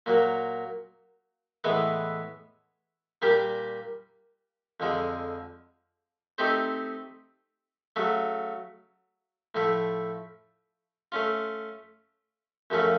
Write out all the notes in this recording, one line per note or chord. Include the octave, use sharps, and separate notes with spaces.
A#2 F#3 A#3
A2 E3 G#3 B3 E4
A#2 G3 A#3 D4 G4
F2 D3 F3 G#3
A3 C4 D#4 G4 C5
C#3 F#3 A3
A2 F3 A3
A3 C#4 F4
F#2 C#3 F3 A3 C#4